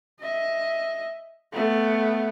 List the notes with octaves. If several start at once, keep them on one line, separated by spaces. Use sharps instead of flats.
D#5 E5
A3 B3